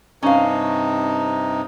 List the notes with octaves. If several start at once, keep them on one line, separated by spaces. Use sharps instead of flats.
G2 C3 C#4 D#4 F5